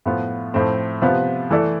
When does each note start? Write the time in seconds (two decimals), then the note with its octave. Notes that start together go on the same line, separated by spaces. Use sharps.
0.06 A2 F3 B3 F4
0.54 A2 F3 A3 C4
1.02 C3 F3 B3 F4 B4
1.50 E3 A3 E4 A4 D5